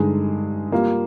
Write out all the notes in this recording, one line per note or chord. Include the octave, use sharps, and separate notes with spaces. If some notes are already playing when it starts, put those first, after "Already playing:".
Already playing: G2 D3 G#3 D#4 G#4
G3 A#3 F4